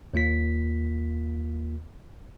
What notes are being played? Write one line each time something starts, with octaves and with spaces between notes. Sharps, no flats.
D#2 A#3 F4 B6